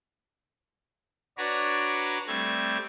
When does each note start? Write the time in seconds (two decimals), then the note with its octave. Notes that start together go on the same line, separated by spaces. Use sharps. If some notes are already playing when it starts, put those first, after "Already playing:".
1.38 D4 F#4 B4 C#5 D5 A#5
2.27 G3 A3 C4 G#6